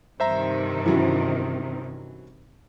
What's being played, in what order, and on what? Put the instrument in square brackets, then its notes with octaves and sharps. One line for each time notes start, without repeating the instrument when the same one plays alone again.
[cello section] G2 C3 D#3 [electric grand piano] C5 E5 A#5
[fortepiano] E3 F#3 C#4